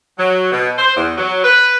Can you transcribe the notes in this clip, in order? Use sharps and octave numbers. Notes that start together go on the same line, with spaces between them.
F#3
B2
C5
E2
F#3
B4